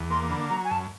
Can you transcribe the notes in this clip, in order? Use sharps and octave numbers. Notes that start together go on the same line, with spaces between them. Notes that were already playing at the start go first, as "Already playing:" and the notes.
Already playing: E2
A#3 C6
D3 B5
F#3 A#5
G#5
F#2 A5